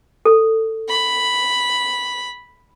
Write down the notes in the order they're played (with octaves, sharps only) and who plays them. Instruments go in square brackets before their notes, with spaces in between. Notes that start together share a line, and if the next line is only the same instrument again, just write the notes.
[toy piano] A4
[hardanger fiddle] B5